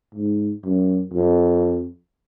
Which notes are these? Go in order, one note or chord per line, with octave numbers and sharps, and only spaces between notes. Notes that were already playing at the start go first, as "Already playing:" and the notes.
G#2
F#2
F2